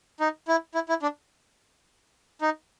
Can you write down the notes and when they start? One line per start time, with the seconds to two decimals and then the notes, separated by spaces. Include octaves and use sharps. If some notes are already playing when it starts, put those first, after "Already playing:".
0.20 D#4
0.48 E4
0.75 E4
0.89 E4
1.02 D4
2.41 D#4